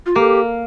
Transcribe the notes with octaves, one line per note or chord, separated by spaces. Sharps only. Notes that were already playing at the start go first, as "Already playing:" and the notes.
F4
A#3 G4